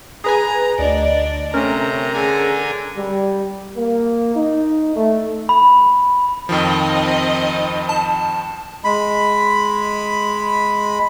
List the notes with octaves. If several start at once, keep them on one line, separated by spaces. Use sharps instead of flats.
G#4 B4 G#5 A#5
D2 D4 D5 D#5
C3 A3 C#4 A#4 A#5
D3 G#4 G#5
G3
A#3
D#4
A3
B5
F2 D#3 F3 C4 D#4 D#5
A5
G#3 B5